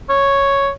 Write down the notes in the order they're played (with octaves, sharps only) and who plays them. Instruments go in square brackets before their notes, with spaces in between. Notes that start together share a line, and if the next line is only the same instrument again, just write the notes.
[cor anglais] C#5